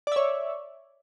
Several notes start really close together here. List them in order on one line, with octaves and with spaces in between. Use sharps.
D5 E5 C#5